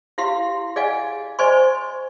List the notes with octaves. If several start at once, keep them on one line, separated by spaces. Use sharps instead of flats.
E4 G4 F5 C6
G#4 D5 D#5 F5 F#5 G#5
C5 D5 D#5 G#5 C6 C#6